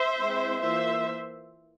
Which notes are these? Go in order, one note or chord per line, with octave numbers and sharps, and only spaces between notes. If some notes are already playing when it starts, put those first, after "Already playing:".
Already playing: C5 E5
G#3 C4 E4
E3 A#3 F4 C5 E5